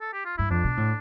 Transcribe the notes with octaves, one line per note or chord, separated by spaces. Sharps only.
A4
G4
F4
G2 E4
F2 D4
B2
A2